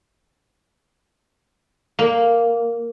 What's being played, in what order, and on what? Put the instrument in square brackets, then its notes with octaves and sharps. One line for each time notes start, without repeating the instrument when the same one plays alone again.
[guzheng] A#3